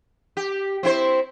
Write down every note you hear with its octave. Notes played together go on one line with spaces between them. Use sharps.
G4
C4 E4 C5